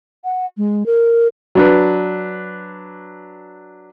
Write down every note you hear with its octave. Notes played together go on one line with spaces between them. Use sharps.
F#5
G#3
A#4
F#3 D4 B4